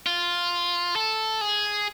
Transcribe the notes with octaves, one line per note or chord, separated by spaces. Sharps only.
F4
A4
G#4